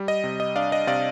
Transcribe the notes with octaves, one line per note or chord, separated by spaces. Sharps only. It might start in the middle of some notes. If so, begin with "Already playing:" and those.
Already playing: G3
D#5
C3
D#5
D4 D5 F5
D#5
C3 D5 F5